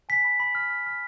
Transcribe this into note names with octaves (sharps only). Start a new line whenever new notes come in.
G#5 B6
B5
B5
F6
F6
F6